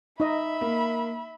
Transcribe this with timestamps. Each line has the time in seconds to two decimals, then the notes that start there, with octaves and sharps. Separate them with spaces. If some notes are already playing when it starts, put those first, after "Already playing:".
0.20 D#4 D#5 E5 B5
0.61 A#3